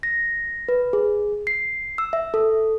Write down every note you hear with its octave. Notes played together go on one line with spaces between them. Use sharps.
A#6
B4
G#4
C7
E6
E5
A4